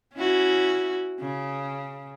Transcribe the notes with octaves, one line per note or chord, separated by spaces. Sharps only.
C#4 E4 F#4
C#3